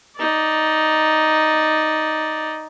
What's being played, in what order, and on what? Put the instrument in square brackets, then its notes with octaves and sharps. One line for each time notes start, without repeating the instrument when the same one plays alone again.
[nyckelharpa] D#4 D5